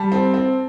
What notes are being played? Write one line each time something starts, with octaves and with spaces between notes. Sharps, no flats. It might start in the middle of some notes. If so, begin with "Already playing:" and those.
Already playing: G3 A5
C4
C4